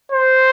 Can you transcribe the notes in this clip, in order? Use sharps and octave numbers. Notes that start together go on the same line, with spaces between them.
C5